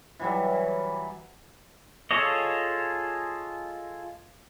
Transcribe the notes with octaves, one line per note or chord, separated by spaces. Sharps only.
E3 F#3 G3
F4 G#4 A4 C#5 D#5